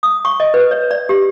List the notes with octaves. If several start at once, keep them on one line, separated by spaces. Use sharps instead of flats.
D#6
C#6
D#5
B4
C#5
D5
G4